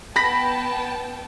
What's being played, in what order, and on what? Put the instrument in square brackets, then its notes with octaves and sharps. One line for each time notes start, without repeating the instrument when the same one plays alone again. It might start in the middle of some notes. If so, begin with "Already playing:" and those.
[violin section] B3 G5 A5 [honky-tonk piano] B5 A#6 B6